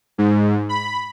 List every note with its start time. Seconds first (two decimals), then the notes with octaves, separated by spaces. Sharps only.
0.18 G#2
0.69 B5